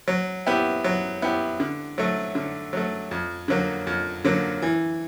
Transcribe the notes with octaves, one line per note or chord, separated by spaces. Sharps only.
F#3
B3 E4 G4
F#3
B3 E4 G4
D3
F#3 A3
D3
F#3 A3
F2
D3 F#3 A#3
F2
D3 F#3 A#3
E3